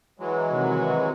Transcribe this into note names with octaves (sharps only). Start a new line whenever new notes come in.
E3 F#3 G#3
C3 D#3 F#4